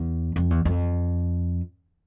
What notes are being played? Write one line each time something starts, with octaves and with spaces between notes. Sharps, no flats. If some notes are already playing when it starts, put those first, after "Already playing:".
Already playing: E2
F2
E2
F2